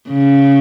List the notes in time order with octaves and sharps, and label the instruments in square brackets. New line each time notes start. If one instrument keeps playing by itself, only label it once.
[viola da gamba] C#3